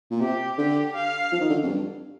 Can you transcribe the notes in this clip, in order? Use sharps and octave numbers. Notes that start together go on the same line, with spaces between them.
A#2
C3 G4
D3 G4
F5
F3
D#3
D3
F2
G2